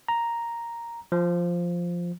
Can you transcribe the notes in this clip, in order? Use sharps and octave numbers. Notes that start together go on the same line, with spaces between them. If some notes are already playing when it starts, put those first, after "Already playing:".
A#5
F3